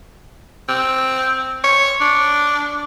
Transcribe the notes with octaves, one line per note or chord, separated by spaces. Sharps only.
C4
C#5
D4